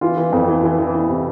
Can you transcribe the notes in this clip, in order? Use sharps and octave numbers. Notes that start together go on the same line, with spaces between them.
E3 F4
E3
F2
E3
E3
E3
E3
C3